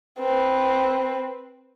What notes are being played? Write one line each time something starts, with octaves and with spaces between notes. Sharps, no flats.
C4 B4